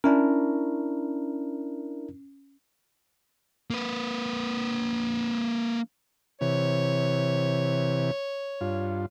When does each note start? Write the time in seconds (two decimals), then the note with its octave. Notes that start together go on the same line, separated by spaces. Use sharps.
0.04 C#4 D4 E4 A#4
3.70 A#3 B4
6.41 C3 E3 C#5
8.61 G2 F4